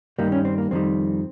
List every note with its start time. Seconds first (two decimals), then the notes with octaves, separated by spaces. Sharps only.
0.19 G2 D#3 G3 A#3
0.32 C#4
0.45 C4
0.58 A#3
0.71 F2 D#3 G3 C4